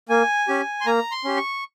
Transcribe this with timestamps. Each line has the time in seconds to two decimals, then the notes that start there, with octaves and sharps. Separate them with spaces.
0.09 A#3 G#5
0.48 C#4 G4
0.81 C6
0.86 A#3 A#5
1.12 C6
1.25 C#4 G4
1.37 C#6